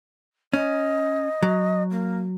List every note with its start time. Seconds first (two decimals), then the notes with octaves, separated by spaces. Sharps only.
0.53 C#4 D#5
1.43 F#3
1.91 A#3